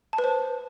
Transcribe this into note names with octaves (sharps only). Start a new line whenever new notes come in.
A5
B4
C5